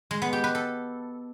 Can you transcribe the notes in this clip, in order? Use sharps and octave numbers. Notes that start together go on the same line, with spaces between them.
G#3
B3
G4
B4
A4